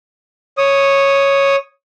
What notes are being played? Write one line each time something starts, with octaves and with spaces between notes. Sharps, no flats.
C#5 D#6